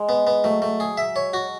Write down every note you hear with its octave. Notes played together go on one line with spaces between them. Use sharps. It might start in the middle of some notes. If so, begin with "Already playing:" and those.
Already playing: G#3
B3
B3
F#3 A3
A3
G#4
E5
C#5
F#4